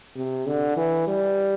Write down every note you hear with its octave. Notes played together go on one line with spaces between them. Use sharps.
C3
D3
E3
G3